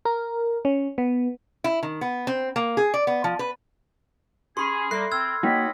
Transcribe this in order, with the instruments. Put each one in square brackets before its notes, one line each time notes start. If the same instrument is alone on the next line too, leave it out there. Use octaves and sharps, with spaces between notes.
[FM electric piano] A#4
C#4
B3
[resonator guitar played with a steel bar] E4
D#3
B3
C4
A#3
G#4
D5
B3
F3
B4
[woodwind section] C#4 G#4 [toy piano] G4 [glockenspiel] B5 C6
[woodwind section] G3 A#3 [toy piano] A4 E5 [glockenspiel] F#6 C7
[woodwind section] C4 [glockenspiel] E6 F6 G#6
[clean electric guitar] A#3 D#4 F#4 [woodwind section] C#5 D#5 B5 [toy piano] G5